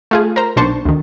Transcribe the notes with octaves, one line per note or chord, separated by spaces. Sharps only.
A3 F4 G#4
A#4 C5 A#5
B1 A#2 D4 C5 A5 C#6
D2 D#3